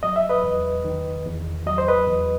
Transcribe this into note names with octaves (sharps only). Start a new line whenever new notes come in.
F#3 D#5
E5
B4 D#5
E2
D#3
E2
F#3 D#5
C5
B4 D#5
E2